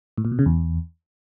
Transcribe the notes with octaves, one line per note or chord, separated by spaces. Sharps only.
A2
A#2
B2
C#3
E2